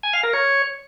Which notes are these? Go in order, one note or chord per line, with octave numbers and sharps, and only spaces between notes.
G#5
F5
A#4
C#5